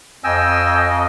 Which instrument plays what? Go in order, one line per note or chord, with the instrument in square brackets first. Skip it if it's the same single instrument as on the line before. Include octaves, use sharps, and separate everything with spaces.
[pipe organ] F2 D#5 [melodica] G5 G#5 E6